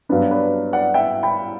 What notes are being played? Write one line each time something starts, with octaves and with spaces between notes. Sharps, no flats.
G2 F#3 B3 D4 B4
B4 D5
D5 F#5
E5 G5
G5 B5